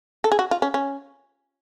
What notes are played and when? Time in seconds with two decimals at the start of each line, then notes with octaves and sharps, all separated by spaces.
0.24 A4
0.32 G#4
0.39 F#4
0.51 F4
0.62 C#4
0.74 C#4